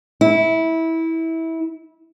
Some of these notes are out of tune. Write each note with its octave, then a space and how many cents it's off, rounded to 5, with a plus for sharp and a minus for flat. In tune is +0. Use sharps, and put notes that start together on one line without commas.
E4 -20